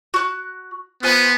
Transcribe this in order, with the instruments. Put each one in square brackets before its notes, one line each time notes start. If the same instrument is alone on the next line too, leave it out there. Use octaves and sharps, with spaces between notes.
[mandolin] F#4 F#6
[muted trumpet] B3 [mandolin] F4 C5 G#5